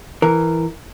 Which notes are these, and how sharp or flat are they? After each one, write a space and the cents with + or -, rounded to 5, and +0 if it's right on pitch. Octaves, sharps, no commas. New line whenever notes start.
E3 +0 A#4 -10